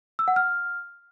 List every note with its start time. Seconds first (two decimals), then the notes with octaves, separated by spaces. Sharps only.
0.19 E6
0.28 F#5
0.36 F6